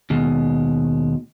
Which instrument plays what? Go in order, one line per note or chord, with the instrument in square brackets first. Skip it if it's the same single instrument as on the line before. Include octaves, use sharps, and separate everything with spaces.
[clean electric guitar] D#2 B2 G#3